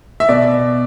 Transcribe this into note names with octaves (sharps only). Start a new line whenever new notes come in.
E5
B2 D5